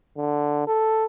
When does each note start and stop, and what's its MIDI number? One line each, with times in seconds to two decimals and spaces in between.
0.17 0.63 50
0.67 1.05 69